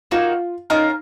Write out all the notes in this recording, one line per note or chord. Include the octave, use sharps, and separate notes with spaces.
A#3 D#4 F4 F#4 A#4
C#4 D#4 F4 A#4